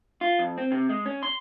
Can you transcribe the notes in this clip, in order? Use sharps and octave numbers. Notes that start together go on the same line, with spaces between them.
F4
F2
C4
C3
G#3
C#4
C6